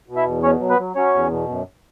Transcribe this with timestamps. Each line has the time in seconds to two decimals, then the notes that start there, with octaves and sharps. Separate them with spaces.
0.08 B2
0.16 E4 E5
0.25 E2
0.43 B2 C#4 C#5
0.60 F#3
0.69 B3 B4
0.79 F#3
0.95 F#3 C#4 C#5
1.14 E2
1.31 B2
1.49 F#2